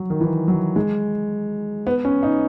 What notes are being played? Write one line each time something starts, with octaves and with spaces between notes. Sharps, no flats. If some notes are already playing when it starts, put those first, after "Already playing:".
Already playing: F#3
D#3
E3
F#3
G#3
B3
C#4
D#4